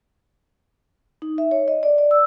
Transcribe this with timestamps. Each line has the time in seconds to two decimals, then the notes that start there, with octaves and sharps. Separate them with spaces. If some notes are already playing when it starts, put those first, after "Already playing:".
1.22 D#4
1.38 E5
1.51 C#5
1.68 D#5
1.83 D5
1.98 D5
2.11 E6